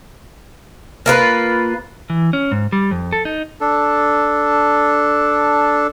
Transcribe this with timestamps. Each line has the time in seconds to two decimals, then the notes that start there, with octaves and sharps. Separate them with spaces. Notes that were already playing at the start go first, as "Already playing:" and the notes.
1.06 A#3 F4 B4
2.10 E3
2.33 C#4
2.52 G#2
2.73 G3
2.91 F2
3.13 A4
3.25 D#4
3.61 D4 A4